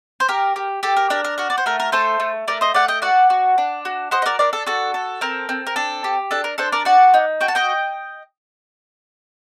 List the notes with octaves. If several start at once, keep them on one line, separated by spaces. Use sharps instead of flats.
C5
G4 A#4
G4
G4 A4
A#4
D4 A#4
A#4
F#4 A#4
D5
C5
A3 A#4
A#4
A3 A4 C5
A3
A3 A#4 D5
C5 D#5
A3 D5 F#5
D#5 G5
F#4 D5 F#5
F#4
D4
F#4
F#4 C5 D#5
D#5
A#4 D5
D4 A#4 D5
A4
F#4 A4
A4
C4 A#4
C4
A#4
D4 A4
G4
D4 A4
A#4
D4 A4 C5
A#4 D5
F#4 D5 F#5
D#4
F#4 G5
A5
D#5 G5